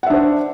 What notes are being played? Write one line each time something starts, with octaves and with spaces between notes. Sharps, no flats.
D4 C5 E5 F#5